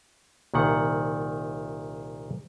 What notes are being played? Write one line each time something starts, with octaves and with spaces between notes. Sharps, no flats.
C2 A#2 D#3 F#5